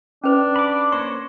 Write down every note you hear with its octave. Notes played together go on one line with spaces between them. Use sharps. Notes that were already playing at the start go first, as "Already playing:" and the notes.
C#4 D4 B4 C5
B5 D6
A#3 C5 C#5 C#6